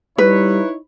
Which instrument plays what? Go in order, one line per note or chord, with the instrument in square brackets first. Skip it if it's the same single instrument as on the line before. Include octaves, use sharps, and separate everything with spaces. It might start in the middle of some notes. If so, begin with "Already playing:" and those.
[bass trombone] G3 [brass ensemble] D#4 E4 C#5 [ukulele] B4